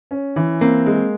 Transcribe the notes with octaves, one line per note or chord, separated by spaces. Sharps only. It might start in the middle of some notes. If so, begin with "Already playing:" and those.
C#4
E3
A#3 C4
G#3